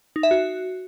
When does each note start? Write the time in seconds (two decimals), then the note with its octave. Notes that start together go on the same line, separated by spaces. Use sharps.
0.16 D#4
0.23 E5
0.31 F#4